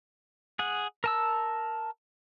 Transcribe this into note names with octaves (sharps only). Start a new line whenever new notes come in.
G#4 F#5
A#4 A5 E6